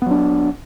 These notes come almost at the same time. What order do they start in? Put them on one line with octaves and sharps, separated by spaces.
B3 F#3 D4